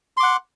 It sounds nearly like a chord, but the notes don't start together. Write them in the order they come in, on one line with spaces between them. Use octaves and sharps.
C6 D6 F#5